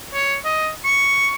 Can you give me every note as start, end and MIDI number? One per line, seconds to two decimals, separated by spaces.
0.14 0.34 73
0.45 0.69 75
0.85 1.35 85